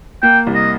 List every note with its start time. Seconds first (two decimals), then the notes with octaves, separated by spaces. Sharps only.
0.22 A#3 G5
0.47 C2
0.55 D#5